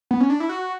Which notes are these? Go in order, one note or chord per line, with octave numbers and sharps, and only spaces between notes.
B3
C#4
D4
E4
F#4